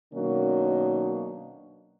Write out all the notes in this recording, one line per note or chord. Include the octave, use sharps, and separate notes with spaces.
B2 D#3 F#3 A#3 C#4 D4